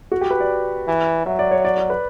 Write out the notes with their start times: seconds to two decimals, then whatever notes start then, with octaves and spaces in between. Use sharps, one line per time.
0.12 F#4
0.21 G4
0.31 B4
0.40 D5
0.88 E3
1.26 F#3 E5
1.39 D5
1.51 C#5
1.65 D5
1.77 D5
1.90 B4